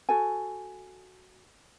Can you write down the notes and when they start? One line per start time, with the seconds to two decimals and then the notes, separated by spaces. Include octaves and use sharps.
0.09 F#4 A4 G#5